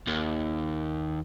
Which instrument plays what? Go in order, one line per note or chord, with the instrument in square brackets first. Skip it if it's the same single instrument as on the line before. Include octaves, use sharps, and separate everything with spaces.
[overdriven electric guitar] D#2